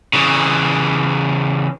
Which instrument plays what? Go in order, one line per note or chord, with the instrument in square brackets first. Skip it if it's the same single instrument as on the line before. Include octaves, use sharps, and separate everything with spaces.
[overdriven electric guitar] C#3 E3